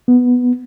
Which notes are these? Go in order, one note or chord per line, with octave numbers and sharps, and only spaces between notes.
B3